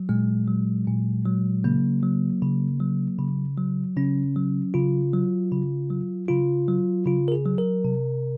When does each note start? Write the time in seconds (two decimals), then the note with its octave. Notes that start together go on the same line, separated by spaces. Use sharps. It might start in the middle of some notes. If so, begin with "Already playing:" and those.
Already playing: F#3
0.09 A#2 G#3
0.48 F#3
0.87 A#2
1.26 F#3
1.64 C#3 A#3
2.03 F#3
2.42 C#3
2.80 F#3
3.19 C#3
3.58 F#3
3.97 C#3 C#4
4.36 F#3
4.74 C#3 F4
5.13 F#3
5.52 C#3
5.90 F#3
6.28 C#3 F4
6.68 F#3
7.06 C#3 F4
7.28 A#4
7.32 G#4
7.46 F#3
7.58 A#4
7.85 C3